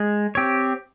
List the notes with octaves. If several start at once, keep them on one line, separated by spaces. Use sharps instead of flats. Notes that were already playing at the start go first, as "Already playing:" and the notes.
Already playing: G#3
C4 G4 C#5